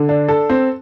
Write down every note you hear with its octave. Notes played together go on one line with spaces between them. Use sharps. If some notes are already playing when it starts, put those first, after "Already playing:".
Already playing: D3
D4
A4
C4